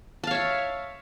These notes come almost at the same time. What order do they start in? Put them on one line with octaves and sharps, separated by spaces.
A5 F5 C#5 E5